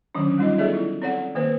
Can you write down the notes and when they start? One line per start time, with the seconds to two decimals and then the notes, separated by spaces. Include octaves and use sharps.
0.15 D3 D#3 F#3 C#4 D4
0.38 G3 G#3 D#4 F4 D#5
0.58 B3 G#4 A4 D5 E5
0.73 E4
1.02 C4 A4 C#5 D5 F#5
1.35 D#3 A#3 B4 C5